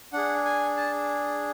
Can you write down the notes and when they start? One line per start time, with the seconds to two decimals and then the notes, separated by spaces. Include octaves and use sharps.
0.13 D4 G#4 F#5
0.45 G#5
0.77 A5